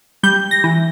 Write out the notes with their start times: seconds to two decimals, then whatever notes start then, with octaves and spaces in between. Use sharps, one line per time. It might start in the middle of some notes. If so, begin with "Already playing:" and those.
0.23 G3 G6
0.51 A#6
0.64 E3